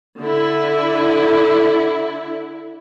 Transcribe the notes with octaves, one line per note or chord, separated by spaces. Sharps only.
D3 E4